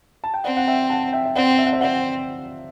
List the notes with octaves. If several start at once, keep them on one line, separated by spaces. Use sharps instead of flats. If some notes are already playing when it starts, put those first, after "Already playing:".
A5
G5
C4 D5 F#5
F#5
E5 G5
F#5 A5
E5 G5
E5
C4 D5 F#5
E5
F#5
C5 E5
C4 D5 F#5